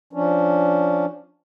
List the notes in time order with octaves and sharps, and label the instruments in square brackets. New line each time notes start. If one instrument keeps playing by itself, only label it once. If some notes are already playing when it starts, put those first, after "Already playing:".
[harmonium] F3 C#4 D4